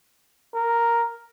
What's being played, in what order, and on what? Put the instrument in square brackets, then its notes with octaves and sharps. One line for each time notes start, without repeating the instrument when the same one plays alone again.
[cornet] A#4